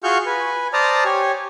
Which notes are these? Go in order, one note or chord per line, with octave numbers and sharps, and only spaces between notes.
F4 F#4 G#4 C#6 F6 G6
B4 G#5
C5 D5 A5 A#5 D#6 F6
G4 C#5 G#5